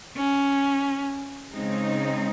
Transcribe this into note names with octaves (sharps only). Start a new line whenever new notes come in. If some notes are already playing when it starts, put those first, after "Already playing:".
C#4
C#3 G#3 C4 D#4